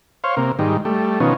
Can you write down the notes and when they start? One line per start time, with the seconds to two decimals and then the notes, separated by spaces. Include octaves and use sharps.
0.24 C5 C#5 F5
0.37 C3 A#3
0.59 G#2 D#3 G3
0.85 G3 A3
1.20 B2 D#3 F3 C#4